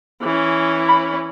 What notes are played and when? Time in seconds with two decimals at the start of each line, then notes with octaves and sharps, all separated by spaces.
0.22 E3 C#4
0.88 B5